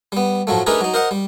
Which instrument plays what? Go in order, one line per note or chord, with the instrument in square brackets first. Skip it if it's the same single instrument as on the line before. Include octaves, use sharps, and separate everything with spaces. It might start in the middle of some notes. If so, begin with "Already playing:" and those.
[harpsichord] G3 B3
A2 F3 F#3 A3
A3 D4 D#4 G#4 A#4 B4
F#3 D#4
A#4 C5 D#5 F#5
G3